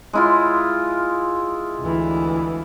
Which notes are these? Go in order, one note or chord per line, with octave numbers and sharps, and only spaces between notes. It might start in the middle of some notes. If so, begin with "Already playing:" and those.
G#3 E4 F4
D2 E3